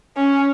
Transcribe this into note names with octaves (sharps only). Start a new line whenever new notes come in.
C#4